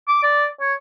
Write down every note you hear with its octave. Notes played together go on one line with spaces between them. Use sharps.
D6
D5
C#5